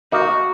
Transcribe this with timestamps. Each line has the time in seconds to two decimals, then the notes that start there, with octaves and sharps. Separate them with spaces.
0.12 A#3 D#4 F#4